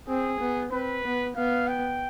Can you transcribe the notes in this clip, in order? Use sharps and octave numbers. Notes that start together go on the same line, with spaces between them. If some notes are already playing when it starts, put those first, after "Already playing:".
C4 G#4
B3
C4 B4
B3
B3 F5
G5